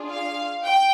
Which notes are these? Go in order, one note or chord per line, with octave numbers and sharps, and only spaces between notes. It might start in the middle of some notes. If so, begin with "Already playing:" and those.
Already playing: D4 F4 G#4
F5
G5